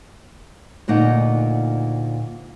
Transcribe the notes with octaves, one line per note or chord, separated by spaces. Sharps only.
D2 A#2 D#4 F#5